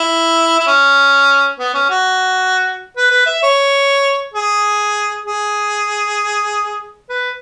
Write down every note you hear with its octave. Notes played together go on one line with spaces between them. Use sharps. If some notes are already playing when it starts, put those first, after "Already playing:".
Already playing: E4
E4
C#4
B3
C#4
F#4
B4
B4
E5
C#5
G#4
G#4
B4